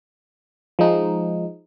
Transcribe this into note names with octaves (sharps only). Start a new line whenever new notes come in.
F3 G#3 D#4